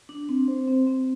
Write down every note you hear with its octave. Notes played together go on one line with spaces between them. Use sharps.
D4
C4
C5
C4
C4